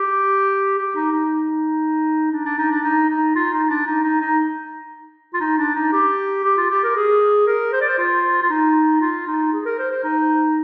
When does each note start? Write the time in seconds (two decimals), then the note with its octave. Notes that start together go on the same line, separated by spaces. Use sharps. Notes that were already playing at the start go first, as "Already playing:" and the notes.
Already playing: G4
0.78 G4
0.95 D#4
1.12 D#4
2.32 D4
2.45 D4
2.58 D#4
2.71 D4
2.84 D#4
3.09 D#4
3.35 F4
3.53 D#4
3.69 D4
3.87 D#4
4.04 D#4
4.21 D#4
5.34 F4
5.40 D#4
5.58 D4
5.75 D#4
5.92 G4
6.44 G4
6.57 F4
6.70 G4
6.84 A#4
6.95 G#4
7.47 A#4
7.72 C5
7.81 D5
7.89 C5
7.98 F4
8.42 F4
8.50 D#4
9.01 F4
9.27 D#4
9.53 G#4
9.65 A#4
9.78 C5
9.91 C5
10.04 D#4